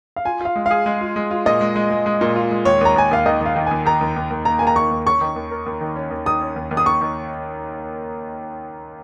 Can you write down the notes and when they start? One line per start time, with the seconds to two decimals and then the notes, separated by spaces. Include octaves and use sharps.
0.16 F5
0.25 F4 G#5
0.41 F4 F5
0.56 G#3
0.66 G#4 F5
0.86 G#3
1.01 F4
1.16 G#3
1.31 F4
1.46 A#2 D#5
1.61 G#3
1.76 G#3
1.91 G#3
2.06 G#3
2.21 A#2
2.36 F4
2.51 G#3
2.65 D#2 C#5
2.81 D#2 A#5
2.96 D#2 G#5
3.11 D#2 F5
3.26 D#3 D#5
3.41 D#3 F5
3.56 D#3
3.66 D#2 G#5
3.86 D#3 A#5
4.01 D#2
4.16 D#2
4.31 D#2
4.45 A#3 A#5
4.59 A#3 G#5
4.67 A#5
4.76 D#3 C#6
4.91 D#2
5.06 C#4 C#6
5.21 D#3
5.36 D#2
5.51 A#4
5.66 D#2
5.81 D#3
5.96 C#4
6.11 D#2
6.26 D#3 D#6
6.41 C#4
6.56 D#2
6.71 D#2
6.77 D#6
6.86 D#2 C#6
7.01 D#3